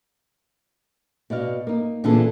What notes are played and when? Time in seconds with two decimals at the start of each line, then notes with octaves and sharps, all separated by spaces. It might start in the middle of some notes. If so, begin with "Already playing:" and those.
1.30 B2 D5 D#5 F5
1.67 A#3 D#4
2.04 A#2 D3 E3 F4 G#4 A4